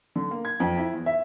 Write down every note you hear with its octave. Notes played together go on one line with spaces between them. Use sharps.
D3
A#3
G#6
F2
E4
E2
E5